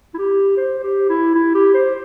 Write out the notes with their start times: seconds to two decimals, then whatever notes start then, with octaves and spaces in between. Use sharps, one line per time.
0.14 E4
0.18 G4
0.57 C5
0.83 G4
1.09 E4
1.35 E4
1.55 G4
1.74 C5